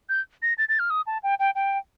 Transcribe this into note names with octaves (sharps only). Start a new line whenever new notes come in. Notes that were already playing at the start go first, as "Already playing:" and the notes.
G6
A#6
A6
A6
F6
D#6
A5
G5
G5
G5